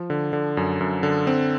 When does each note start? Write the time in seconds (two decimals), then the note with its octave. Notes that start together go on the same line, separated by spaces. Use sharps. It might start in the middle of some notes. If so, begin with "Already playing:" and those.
Already playing: F3
0.10 D3
0.33 D3
0.57 F#2
0.81 F#2
1.03 D3
1.27 C4